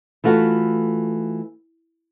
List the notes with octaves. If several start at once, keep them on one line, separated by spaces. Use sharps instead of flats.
E3 A3 F4 F#4